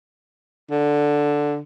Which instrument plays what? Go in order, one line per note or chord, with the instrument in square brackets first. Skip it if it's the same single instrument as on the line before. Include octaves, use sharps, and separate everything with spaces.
[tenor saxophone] D3